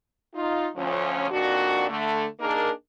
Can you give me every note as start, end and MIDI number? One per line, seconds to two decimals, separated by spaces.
0.34 0.67 63
0.34 0.67 65
0.75 1.27 38
0.75 1.27 53
0.75 1.27 61
1.31 1.87 41
1.31 1.87 46
1.31 1.87 51
1.31 1.87 62
1.31 1.87 66
1.88 2.25 50
1.88 2.25 57
2.39 2.69 58
2.39 2.69 62
2.39 2.69 63
2.39 2.69 68
2.39 2.69 70